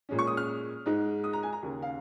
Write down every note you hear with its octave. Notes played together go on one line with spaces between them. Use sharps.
A#2 G#3 C#4
C#6
D#6
F6
G#2 G#3 D#4
D#6
A#5
G#5
A#5
D#2 C#3 A#3
F5